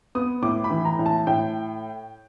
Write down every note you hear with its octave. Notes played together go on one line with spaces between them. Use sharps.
B3 D#6
A2 D6
B5
E3
A#5
A2
A5
A2 G5